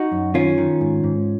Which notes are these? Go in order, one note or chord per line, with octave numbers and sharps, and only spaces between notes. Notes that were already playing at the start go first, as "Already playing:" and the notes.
Already playing: D#4 F#4
F#2
D#3 C#4 F4
D#3
G#2
G#2